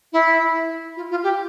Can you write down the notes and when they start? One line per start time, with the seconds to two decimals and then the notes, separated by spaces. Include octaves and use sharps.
0.13 E4
0.96 F4
1.10 F4
1.23 G4